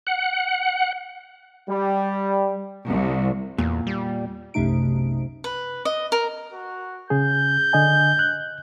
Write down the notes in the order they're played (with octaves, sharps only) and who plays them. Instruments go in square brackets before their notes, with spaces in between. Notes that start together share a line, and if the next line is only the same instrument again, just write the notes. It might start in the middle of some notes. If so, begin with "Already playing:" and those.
[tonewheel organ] F#5
[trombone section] G3
[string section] C2
[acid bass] E2 [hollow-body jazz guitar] A#2
[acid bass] G3
[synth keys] B1 F#2 C3 A3 D#4 D7
[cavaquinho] B4
D#5
A#4
[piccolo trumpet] F#4
[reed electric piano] C#3 G#4 [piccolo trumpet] G6
[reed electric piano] D3 D#5 G#5
F#6